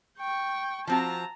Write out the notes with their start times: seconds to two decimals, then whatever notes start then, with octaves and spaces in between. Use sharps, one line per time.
0.19 G5 C#6
0.87 F3 C4 F#4 A5 A#5